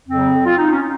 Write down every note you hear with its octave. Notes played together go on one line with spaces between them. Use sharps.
F2 C#3 F#3 C4
F4
D#4
C#4